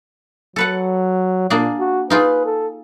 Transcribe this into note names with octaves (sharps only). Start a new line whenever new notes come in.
F#3 A4 B4 F#5
A#2 A#3 D4 G#4
F#4
D#4 F4 G#4 B4
A4